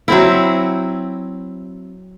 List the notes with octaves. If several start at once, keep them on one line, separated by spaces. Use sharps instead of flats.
F#3 C4 E4